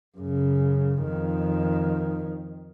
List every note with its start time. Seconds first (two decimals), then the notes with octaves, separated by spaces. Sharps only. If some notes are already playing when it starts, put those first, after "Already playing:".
0.18 F#2 C#3
1.01 F2 D#3